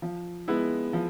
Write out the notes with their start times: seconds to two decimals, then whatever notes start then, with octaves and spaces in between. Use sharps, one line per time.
0.02 F3
0.48 G#3 B3 E4
0.93 F3